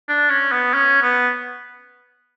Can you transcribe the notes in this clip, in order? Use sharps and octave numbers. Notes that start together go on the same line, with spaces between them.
D4
C#4
B3
C#4
B3